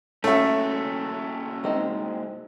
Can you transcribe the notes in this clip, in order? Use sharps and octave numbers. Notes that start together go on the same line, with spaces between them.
A3 A#3 C#4 E4 F#4 E5
G#3 C4 D#4